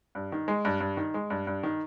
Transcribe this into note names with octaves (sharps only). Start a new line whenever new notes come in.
G2
D#3
G#3
G2
G2
D#3
G#3
G2
G2
D#3